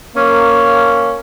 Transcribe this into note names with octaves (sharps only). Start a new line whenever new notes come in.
A#3 C#4